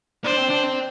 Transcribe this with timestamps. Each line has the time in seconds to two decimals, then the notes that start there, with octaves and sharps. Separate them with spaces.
0.24 D4 C5
0.37 C4
0.50 D4
0.63 C4